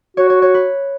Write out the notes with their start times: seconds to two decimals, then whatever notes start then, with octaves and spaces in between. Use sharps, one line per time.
0.17 F#4 C#5
0.30 C#5
0.42 C#5
0.54 B4